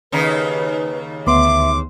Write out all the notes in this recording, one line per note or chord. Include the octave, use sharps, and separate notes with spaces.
D#2 C#3 D#4 B4
D2 B3 E5 C6 D6